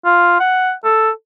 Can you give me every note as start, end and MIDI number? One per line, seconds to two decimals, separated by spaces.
0.05 0.37 65
0.40 0.72 78
0.84 1.10 69